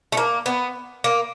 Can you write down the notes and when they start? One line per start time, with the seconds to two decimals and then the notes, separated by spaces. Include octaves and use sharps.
0.12 A3
0.17 A#3
0.46 B3
1.04 A#3